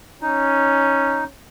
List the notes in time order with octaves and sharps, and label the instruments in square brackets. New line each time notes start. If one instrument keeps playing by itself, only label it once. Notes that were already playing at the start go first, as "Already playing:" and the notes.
[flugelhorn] C#4 [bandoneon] D#4